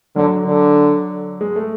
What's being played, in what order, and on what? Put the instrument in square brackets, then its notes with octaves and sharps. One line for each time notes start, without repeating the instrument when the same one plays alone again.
[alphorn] D3 [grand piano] F#3
[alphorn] D3
[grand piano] G#3
A3